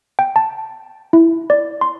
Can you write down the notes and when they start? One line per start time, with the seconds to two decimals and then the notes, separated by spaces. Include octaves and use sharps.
0.19 G5
0.36 A5
1.13 E4
1.50 D5
1.81 C6